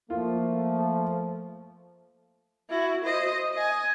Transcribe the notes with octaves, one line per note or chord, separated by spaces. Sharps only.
F3 A3 A#3 F4
E4 F#4
C5 D#5
D#5 G#5